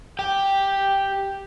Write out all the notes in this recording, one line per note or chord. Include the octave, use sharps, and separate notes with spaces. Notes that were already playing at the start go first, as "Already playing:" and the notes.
G4 G5